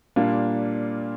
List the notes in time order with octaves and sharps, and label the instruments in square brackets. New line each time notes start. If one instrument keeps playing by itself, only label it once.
[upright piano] A#2 G3 A#3 D4 F4